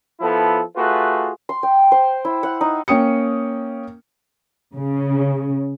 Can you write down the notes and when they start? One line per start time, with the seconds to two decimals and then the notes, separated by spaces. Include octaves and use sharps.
0.20 F3 B3 E4 A4
0.76 A3 F4 F#4 G#4 B4
1.49 C6
1.63 G5
1.92 C5
2.25 E4
2.43 F#5
2.61 D#4
2.88 A#3 C#4 G5 D#6 C#7
4.75 C#3